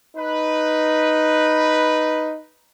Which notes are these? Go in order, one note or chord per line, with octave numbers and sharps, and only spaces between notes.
D#4 B4